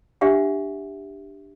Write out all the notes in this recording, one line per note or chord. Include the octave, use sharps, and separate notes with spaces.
D4 G4 E5 F#5